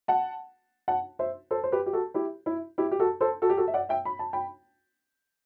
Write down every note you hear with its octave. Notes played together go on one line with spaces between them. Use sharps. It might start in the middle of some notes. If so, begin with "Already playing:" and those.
F#5 A5
F#5 A5
C5 E5
A4 C5
C5
G4 B4
G4
F#4 A4
E4 G4
E4
E4 G4
G4
F#4 A4
A4 C5
F#4 A4
G4
F#4 A4
E5
D5 F#5
E5 G5
B5
A5
G5 B5